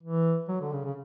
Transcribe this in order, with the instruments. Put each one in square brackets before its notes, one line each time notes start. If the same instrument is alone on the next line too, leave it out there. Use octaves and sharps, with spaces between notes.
[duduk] E3
F#3
D3
C#3
C#3